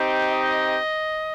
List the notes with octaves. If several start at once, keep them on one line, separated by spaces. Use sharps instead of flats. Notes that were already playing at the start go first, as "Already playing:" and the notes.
Already playing: C4 D#4 G4
D#5